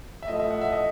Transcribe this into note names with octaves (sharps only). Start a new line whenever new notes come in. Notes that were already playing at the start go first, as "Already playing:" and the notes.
E5
A2 F3 A3 D#5
E5
F#5
E5
D#5